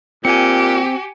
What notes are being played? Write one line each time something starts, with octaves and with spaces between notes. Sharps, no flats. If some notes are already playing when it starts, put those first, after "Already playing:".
A#2 C4 G4 G#5 C#7